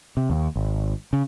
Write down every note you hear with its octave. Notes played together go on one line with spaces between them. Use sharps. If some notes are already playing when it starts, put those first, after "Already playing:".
C3
D#2
G#1
C#3